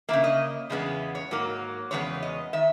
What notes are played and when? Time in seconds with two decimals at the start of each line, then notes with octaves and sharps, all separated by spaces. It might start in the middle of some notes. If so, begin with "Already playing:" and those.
0.09 E3 A#3 E5
0.13 C#3
0.24 D#5
0.70 E2 C#3 G#3 B3
1.15 C#5
1.31 G#2 F#3 A#3
1.91 E2 C#3 G#3 B3 C#5
2.23 D#5
2.53 D#3 E5